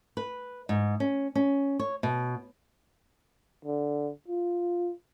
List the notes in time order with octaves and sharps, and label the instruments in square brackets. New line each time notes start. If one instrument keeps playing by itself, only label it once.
[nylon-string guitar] B4
G#2
C#4
C#4
C#5
B2
[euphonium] D3
F4